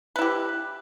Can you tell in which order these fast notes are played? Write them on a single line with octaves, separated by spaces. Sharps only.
B4 E4 G4